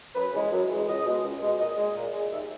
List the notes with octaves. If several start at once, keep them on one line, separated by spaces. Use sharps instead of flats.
F#2 B4
C#3 E3 G#3
F#2
C#3 E3 G#3
C#2 D#5
B2 G#3
C#2
B2 G#3
A#2 D#5
G#3
A#2
G#3
D#2 E5